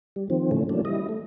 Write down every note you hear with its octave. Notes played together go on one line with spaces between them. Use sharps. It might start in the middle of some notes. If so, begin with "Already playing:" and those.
G3
D#3 F3 C4
A2 C#3 E3 A3 C#4
E3 F#3 A3 A#3 C#4 D4
G3 E4 D#5
A3